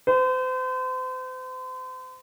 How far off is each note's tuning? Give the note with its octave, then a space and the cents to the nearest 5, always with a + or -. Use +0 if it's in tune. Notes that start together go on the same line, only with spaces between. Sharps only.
C5 -40